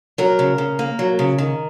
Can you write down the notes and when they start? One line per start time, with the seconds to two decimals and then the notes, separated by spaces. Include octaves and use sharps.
0.18 F#3 A#4
0.39 C#3
0.58 C#3
0.79 A#3
0.99 F#3
1.19 C#3
1.38 D#3